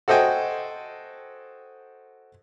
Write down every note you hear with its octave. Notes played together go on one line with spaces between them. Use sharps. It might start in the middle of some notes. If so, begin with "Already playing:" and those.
F#4 A4 C5 D#5 G5 G#5